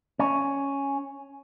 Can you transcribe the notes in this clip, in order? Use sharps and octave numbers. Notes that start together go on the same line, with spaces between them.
C#4